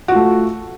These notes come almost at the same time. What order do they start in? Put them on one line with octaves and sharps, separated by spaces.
F#4 F4 A3